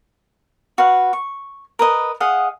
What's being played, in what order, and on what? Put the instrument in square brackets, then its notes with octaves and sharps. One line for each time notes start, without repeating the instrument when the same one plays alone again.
[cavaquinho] F#4 B4 F5
C#6
A#4 B4 D#5
G#4 D#5 F5 F#5